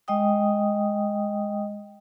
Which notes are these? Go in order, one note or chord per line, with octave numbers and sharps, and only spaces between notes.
G#3 D#5 G5 D#6